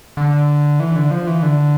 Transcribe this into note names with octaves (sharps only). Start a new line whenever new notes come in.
D3
E3
D3
F3
E3
D3